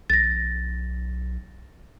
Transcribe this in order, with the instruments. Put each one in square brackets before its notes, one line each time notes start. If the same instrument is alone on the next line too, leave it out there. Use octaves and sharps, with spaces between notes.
[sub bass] B1 [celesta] A6 A#6